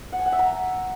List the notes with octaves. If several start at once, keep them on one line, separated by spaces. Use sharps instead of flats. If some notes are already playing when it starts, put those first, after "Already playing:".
F#5
G#5
F#5
E5
A#5